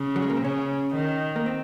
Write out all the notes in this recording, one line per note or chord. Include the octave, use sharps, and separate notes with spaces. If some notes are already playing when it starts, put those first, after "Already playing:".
Already playing: C#3
F#3
G#3
A#3
C4
C#3 C#4
D#3
A#3
C4